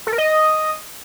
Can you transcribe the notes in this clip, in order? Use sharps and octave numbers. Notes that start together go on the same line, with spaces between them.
A4
A#4
D#5